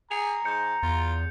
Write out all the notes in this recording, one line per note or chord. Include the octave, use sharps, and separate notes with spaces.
G#4 A#5 C#7 F7
G#2 G6 C#7
E2 F4